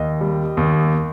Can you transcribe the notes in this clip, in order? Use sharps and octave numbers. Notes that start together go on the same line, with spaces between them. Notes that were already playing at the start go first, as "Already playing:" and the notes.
Already playing: D#2 D#5
G3
D#2